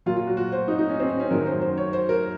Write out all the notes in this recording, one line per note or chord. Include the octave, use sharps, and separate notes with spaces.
A#2 F#3 F4
F4
F#4
F#4
C5
D#4
D#4
C#4
C4
C4
C#4
F#2 D#3 F#3 A#4
C5
C5
C#5
C5
A#4